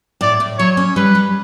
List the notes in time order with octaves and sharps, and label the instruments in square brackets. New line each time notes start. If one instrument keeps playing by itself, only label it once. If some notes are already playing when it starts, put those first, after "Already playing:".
[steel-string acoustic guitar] A2 [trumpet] D5
[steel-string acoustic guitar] A2
[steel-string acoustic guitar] F#3 [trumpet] C#5
[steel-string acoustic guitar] C#4
[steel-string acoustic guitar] G3 [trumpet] B4
[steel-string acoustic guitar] G3